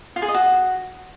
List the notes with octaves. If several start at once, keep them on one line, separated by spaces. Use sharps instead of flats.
F4
G#4
D#5
F#4